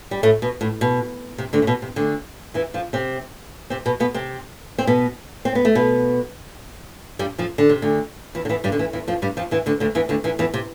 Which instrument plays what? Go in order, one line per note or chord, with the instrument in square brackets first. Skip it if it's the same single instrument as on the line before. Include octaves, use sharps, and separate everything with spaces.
[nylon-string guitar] G3
A2 A3
B2
A2
B2
C3
D2 D3
A2
B2
C3
D2 D3
E2 E3
F2 F3
C3 C4
C3 C4
B2 B3
B2 B3
C3 C4
C4
B2 B3
C4
B3
A3
B2 B3
G2 G3
F2 F3
D3
C3
D2 D3
E2 E3
D3
E2 E3
G2 G3
D3
E2 E3
E2 E3
F2 F3
G2 G3
F2 F3
E2 E3
D2 D3
D2 D3
E2 E3
D2 D3
E2 E3
E2 E3
C3